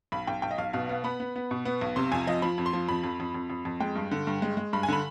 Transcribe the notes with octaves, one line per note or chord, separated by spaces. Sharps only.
B1 B5
B1 G5
B1 G5
D#5
B1 F5
B2 F5
B3 F5
B3 B5
B3
B3
B2
B3
B1
C3 C6
F2 G#5
F3 D#5
F3 B5
F2
C6
F3
F2 B5
F2
F2
F2
F2
F2
G#3 G5
G2
D3
G2
G#3
G#3
G2 B5
G#5
D3 B5